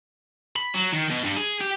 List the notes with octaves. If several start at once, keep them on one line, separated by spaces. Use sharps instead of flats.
B5
F#3
D#3
B2
G2
G#4
G4